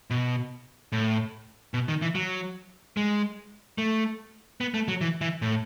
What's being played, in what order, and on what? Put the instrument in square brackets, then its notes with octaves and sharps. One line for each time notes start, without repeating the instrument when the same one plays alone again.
[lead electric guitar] B2
A2
B2
D#3
E3
F#3
G#3
A3
B3
A3
F#3
E3
E3
A2